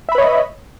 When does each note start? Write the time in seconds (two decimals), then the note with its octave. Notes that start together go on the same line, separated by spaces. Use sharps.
0.09 E5
0.12 B5
0.15 B4
0.18 C#5
0.21 D#5